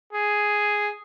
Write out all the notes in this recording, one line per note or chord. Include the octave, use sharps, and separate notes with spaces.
G#4